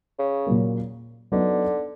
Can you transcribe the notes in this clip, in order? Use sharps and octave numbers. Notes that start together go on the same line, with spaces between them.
C#3
A#2 F#3 A#3
D3 F#3 B3 D#4